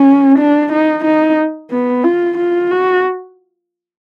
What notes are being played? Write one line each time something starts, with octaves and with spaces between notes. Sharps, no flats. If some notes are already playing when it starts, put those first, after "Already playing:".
Already playing: C#4
D4
D#4
D#4
B3
F4
F4
F#4